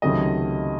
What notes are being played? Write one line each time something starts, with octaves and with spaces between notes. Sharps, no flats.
C#2 C3 D#3 F#3 A3 D#5